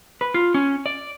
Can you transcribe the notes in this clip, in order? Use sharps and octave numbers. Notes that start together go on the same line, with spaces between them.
B4
F4
C#4
D5